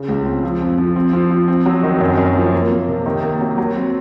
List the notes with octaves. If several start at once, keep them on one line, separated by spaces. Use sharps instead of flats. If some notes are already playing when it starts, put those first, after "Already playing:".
Already playing: C#3
C#2
C4
F3
F2
F3
C4
F3
F3
C4
F#3
D#3
F#2
F#2
F3
A#3
A#3
C3
D#3
A#3
F#3
F#3
C4